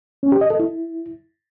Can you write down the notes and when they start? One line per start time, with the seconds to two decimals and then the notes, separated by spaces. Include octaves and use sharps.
0.23 C#4
0.32 G4
0.41 D#5
0.50 A4
0.59 E4